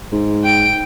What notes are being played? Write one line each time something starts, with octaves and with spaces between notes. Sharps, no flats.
G#2
G5 D7